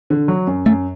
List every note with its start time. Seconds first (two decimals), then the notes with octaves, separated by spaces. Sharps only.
0.10 D3
0.28 F#3
0.47 F#2
0.66 F#2 A3